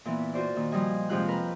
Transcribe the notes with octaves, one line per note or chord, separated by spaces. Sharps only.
A#2 E3 B3
F4 F#4 C5 D5
A#2 D#3
F3 G3 D#5 G#5
F2 C3 F3 G#3 F4 F#6
A#4 B4